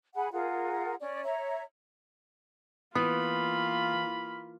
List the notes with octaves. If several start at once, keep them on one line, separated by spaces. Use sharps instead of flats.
G#4 F#5 G#5 B5
F4 G#4 A#4 F#5
C#4 D5
C#5 E5 A#5
E3 A#3 B3 F4 B4 B5